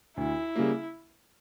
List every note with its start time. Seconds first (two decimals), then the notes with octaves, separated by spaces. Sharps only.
0.17 D2 E4
0.56 C#3 G3 A#3